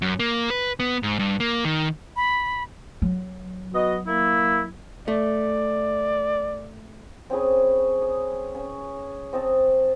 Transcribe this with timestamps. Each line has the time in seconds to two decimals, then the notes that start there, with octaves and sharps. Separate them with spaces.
0.02 F#2
0.20 A#3
0.50 B4
0.80 B3
1.03 G#2
1.19 G2
1.40 A#3
1.65 D#3
2.16 B5
3.02 F#3
3.73 B3 F#4 D#5
4.07 A#3 E4
5.08 A3 D5
7.30 C4 C#4 G#4 B4
8.02 D#6
8.55 C#4
9.33 C4 D#5 A5